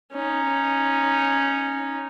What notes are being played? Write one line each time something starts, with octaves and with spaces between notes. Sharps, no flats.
C#4 D#4